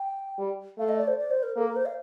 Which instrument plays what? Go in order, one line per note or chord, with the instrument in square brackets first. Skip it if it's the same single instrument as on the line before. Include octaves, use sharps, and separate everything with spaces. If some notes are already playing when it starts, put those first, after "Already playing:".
Already playing: [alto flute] G5
[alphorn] G3
[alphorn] A3 [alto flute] F5
[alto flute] D#5
D5
C5
D5
C5
A#4
[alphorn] A#3 [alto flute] A4
[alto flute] A#4
C5
F5